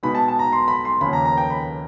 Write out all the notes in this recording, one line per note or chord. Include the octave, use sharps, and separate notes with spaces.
B2 G#3 B3 D#4 B5
A5
A5
A#5
C6
B5
C6
D#2 C#3 F3 A#3 B5
A#5
A#5
G5
B5